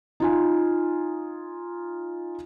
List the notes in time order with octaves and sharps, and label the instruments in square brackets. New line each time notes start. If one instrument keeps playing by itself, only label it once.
[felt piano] D#4 F4 G#5